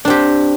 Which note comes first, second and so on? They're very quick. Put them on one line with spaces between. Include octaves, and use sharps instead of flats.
D4 C4 G4